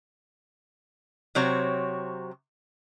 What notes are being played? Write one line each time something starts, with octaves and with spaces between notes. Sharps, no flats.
C3 F#3 C4 C#5